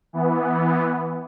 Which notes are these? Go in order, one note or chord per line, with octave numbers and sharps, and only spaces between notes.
E3 B3